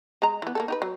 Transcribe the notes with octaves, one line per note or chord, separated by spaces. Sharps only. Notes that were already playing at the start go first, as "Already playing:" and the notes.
G#3 D#5 A#5
E3 B3
A#3 C4 A4
D#4 G4 B4
F#3